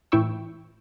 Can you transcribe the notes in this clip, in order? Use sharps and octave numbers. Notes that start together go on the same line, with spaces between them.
A2 E3 E4 G5 C#6 E6